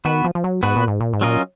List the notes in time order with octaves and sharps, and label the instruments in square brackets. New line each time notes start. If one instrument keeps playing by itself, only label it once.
[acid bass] D#3 [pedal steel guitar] B3 F#4 B4
[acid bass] F3
F3
F#3
[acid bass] G#2 [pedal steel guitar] B3 F#4 B4
[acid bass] A#2
G#2
A#2
G#2
[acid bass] A#2 [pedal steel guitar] F#3 C#4 F4 A#4 D#5